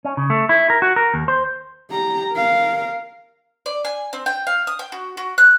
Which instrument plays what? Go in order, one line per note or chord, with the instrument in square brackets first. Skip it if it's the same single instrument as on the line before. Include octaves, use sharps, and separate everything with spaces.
[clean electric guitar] C#4
C#3
A3
E4
A#4
F#4
A#4
D#2
C5
[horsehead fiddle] G4 A#5
A#4 F5
[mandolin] D5
G#5
C4
G5
F5
D#6
G5
F#4
F#4
F#6